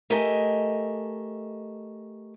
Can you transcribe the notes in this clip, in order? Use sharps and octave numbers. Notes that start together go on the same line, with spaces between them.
A3 G4 A4 A#4 D#5 G#5